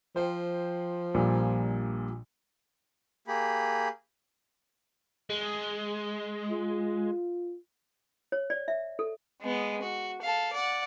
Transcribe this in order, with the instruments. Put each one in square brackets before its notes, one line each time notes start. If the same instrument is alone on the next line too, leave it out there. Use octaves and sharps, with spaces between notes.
[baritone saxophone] F3 [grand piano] C5 G5
[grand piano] A#1 A#2 G3
[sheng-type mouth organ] A#3 G4 G#4 B5
[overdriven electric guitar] G#3
[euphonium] F4
[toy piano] C#5
D5
E5
A4
[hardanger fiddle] G#3 B3
F#4
A4 F5
D5 F#5